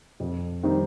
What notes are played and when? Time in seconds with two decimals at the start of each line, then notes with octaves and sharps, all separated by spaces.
0.20 F2
0.63 D#3 G3 C4 D#4